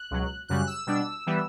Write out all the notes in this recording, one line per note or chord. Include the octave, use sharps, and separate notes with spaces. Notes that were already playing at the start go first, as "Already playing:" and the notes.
Already playing: F#6
C#2 B2 F#3
F#2 C#3 G3 F#6
E6
B2 G3 D4 E6
E3 G3 B3